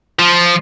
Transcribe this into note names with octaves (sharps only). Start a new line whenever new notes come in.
F3